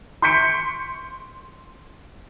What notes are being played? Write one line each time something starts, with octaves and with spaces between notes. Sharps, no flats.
C6 C#6 G6 B6 C#7 D7